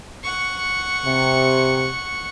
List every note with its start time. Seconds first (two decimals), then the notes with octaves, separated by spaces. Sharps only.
0.24 F#5 C#6
1.05 C3